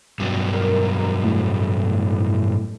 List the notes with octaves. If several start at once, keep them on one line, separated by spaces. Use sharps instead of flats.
G2 B2 F#3
A#4
A2